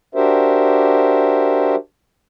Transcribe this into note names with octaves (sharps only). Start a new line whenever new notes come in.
D4 F#4 G4 A#4 C5 E5